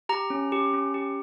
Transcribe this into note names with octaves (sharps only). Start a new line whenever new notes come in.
G4 A#5
C#4
G4
C#4
G4